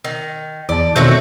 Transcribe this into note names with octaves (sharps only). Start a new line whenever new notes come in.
D#3
E2 D5 A5
B2 D#3 A3 C4 F#4 C#5